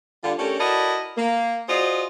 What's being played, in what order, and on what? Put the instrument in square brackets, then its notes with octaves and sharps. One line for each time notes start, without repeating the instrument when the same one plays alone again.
[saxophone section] D3 G3 F4
A3 C#4 D4 G4 A4 A#4
E4 F#4 A4 A#4 D5 D#5
A#3
F4 F#4 G#4 C5 D5 D#5